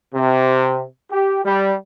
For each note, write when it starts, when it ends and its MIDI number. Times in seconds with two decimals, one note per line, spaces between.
0.14 0.83 48
1.11 1.41 67
1.45 1.72 55